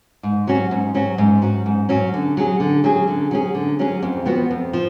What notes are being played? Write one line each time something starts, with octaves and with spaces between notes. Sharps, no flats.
G#2
F#3 C#4 F#4
G#2
F#3 C#4 F#4
G#2
F#3 C#4 F#4
G#2
F#3 C#4 F#4
D3
F#3 C#4 G#4
D3
F#3 C#4 G#4
D3
F#3 C#4 G#4
D3
F#3 C#4 G#4
F2
F3 B3 F#4
F2
F3